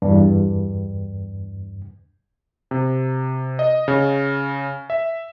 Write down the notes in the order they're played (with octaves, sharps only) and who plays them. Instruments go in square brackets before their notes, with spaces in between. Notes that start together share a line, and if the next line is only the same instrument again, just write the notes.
[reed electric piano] E2 G2
[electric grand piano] C3
D#5
C#3
E5